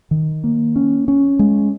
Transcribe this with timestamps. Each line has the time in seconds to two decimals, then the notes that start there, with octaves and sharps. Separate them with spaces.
0.11 D#3
0.44 A#3
0.76 C#4
1.08 C#4
1.39 G#3